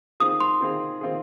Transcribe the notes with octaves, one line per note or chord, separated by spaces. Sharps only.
D#3 C4 F4 G#4 D#6
C6
D#3 C4 F4 G#4
D#3 C4 F4 G#4